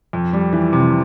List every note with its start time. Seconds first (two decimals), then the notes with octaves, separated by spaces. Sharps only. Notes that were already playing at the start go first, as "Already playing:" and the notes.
0.13 F2
0.33 G3
0.53 E3
0.73 C3